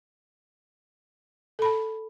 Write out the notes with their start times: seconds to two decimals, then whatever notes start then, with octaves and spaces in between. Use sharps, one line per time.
1.59 A4
1.62 B5
1.65 A5